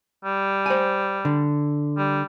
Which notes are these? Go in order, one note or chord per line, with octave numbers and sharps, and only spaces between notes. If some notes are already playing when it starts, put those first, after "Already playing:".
G3
C5 G#5
D3
G3